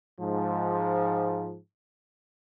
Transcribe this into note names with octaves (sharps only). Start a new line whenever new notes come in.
G#2 F3